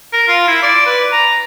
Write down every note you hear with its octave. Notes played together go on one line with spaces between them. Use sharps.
A#4
F4
E4
D5
B4
A#5